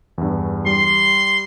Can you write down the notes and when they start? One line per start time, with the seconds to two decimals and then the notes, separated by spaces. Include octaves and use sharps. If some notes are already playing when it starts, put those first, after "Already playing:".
0.18 E2 G2
0.66 G3 C6